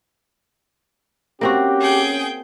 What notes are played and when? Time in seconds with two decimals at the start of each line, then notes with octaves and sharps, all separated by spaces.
1.41 A#3 C4 C#4 F#4 G4
1.81 G#4 G5